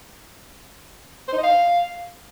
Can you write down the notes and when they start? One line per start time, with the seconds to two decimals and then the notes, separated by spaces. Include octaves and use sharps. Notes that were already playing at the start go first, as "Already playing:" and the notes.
1.28 C5
1.33 D#4
1.38 D#5
1.43 F5